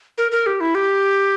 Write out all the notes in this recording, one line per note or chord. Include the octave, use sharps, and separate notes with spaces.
A#4
A#4
G4
E4
G4